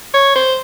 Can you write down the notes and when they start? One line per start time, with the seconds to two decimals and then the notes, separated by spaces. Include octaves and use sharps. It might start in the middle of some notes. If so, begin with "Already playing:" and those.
0.14 C#5
0.36 C5